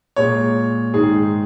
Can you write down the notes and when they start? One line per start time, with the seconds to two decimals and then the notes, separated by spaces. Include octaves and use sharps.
0.16 A#2 G#3 C#5
0.94 G#2 D#3 G#3 G#4